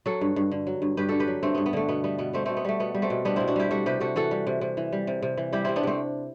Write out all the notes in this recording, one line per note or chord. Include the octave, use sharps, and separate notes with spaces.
F#3 F#4 A4
G2
G2
D3
F#3
G2
G2 G4 B4
D3 F#4 A4
G4 B4
F#3
G2 A3 C4
G2 B3
B3
D3 A3
B2 B3
G3 B3
B2 B3
G3 A3 C4
B2 A3 C4
B3
G3 A3
B2 B3
G3
A3 C4
B2
G3 B3 D4
B2 C4 E4
D4 F#4
G3 E4 G4
G3 F#4 A4
C3 G4 B4
C3 F#4 A4
E3 F#4 A4
G3
C3
C3
E3
G3
C3
C3
E3
G3 E4 G4
C3 C4 E4
B3 D4
C3 A3 C4